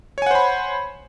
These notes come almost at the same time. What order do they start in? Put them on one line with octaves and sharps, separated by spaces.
C#5 G#5 F#5 C5 B5